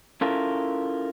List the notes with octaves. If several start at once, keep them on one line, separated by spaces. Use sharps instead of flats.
C#4 E4 F4 A4 A#4